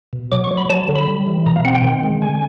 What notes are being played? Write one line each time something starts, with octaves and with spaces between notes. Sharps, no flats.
B2
F#3 D6
C#6
F#3
B5
F#3 A5
D3
B5
G3
E3
B2 A#5
F5
C4 F#5
G5
D#3
G#3
D3 G#5